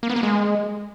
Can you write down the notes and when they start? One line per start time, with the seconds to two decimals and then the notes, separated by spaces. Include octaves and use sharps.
0.03 A#3
0.10 B3
0.16 A#3
0.23 G#3